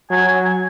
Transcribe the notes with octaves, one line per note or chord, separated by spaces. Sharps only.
F#3 G#5
G#5
G#5